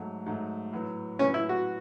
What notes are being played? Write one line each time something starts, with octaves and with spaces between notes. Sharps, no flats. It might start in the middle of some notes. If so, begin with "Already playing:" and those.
Already playing: G#2 F#3 A3
G#2 F#3 A3
A2 F#3 B3
A2 F#3 B3 C#4
E4
F#4